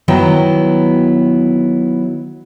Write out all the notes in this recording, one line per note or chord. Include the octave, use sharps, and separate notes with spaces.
D#3 F#3 B3 E4 G5